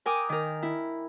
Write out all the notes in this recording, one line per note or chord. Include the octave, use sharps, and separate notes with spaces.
A#4 G5 G#5 D6 D#6
D#3 A#4
E4